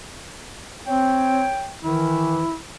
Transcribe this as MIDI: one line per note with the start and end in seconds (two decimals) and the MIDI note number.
0.87 1.45 60
0.87 1.73 73
0.87 1.73 79
1.83 2.44 51
1.83 2.44 52
1.83 2.57 64